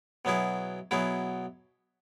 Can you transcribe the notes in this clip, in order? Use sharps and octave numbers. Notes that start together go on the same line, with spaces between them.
B2 F#3 B3 E4 G#4
B2 F#3 B3 E4 G#4